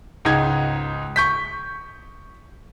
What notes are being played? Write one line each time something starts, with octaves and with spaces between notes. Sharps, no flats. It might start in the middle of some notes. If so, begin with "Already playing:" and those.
C#2 G#2 D#4 G#6
C#6 G6 B6